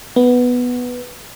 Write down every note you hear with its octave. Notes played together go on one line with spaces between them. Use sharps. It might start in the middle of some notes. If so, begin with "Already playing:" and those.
B3